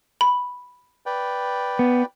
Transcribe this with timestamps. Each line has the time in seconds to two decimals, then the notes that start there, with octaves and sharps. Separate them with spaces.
0.21 B5
1.06 B4 D5 G5
1.79 B3